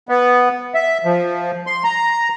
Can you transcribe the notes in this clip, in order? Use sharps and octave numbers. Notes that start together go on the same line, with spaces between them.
B3
E5
F3
C6
A#5